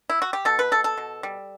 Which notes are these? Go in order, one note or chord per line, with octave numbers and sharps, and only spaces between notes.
E4
F#4
G4
B2 A4
B4
B2 A4
A4
B2
G3